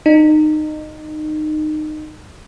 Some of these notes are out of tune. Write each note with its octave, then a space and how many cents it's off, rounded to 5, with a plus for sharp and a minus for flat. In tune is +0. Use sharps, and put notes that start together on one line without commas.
D#4 -20